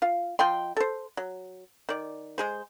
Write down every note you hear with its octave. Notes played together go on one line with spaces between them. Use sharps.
F4 F5
F3 D#5 G5 C6
A4 C5
F#3
D#3 D5
G#3 G#4 C5